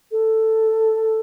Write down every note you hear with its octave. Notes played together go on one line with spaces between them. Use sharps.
A4